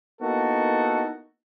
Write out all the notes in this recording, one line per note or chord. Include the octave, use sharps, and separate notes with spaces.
A#3 B3 D#4 E4 F#4 A4